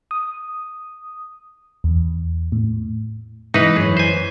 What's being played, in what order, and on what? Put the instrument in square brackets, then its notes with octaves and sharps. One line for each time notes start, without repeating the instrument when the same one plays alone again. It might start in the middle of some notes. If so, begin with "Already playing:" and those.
[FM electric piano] D#6
E2
A2
[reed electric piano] G#2 [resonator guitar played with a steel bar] E3 [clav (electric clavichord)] D#4 B4
[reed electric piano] F#2 C#5 [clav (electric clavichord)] G#4
[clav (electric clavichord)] C5 G#5